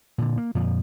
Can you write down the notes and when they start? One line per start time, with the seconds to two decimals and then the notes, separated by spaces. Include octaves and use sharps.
0.18 A#2 D3
0.38 A#3
0.55 F2 A#2 D3 F3